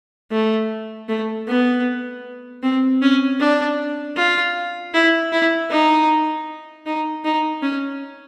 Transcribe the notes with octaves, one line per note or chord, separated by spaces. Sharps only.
A3
A3
B3
C4
C#4
D4
F4
E4
E4
D#4
D#4
D#4
C#4